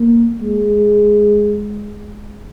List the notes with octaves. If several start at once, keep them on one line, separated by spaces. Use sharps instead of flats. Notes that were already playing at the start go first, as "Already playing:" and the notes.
Already playing: A#3
G#3